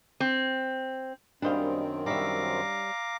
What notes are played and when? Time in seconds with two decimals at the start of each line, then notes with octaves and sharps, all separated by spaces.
0.20 C4
1.42 F#2 D#3 G3 C4 D4 C5 D#5 F5
2.06 G3 C#5 E5 F5 A#5 D6